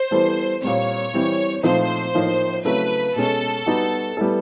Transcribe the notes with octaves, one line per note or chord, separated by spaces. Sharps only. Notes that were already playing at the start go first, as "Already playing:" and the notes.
Already playing: C5
E3 G3 B3 E4 A4
A#2 G3 C4 C#5
E3 G3 C4 E4
A#2 F3 A3 C4 D#4 C5
A2 F3 A#3 D#4
C#3 F#3 A3 C4 E4 B4
B2 G#3 C#4 A4
G3 B3 D#4 F#4 B4
G3 B3 E4 A4